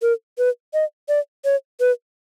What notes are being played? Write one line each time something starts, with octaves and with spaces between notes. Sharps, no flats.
A#4
B4
D#5
D5
C#5
B4